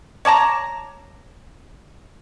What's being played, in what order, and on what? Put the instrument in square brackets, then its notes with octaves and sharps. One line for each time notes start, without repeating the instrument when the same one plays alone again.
[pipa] C#5 D5 A5 A#5